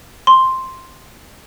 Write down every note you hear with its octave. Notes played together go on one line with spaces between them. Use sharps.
C6